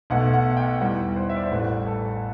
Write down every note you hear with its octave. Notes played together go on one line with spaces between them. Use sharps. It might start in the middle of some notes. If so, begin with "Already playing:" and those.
B1 B2 A3 F#5
F#5
G5
E2 B2 G3 F#5
C5
E5
D5
C5
A1 A2 G3 B4
A4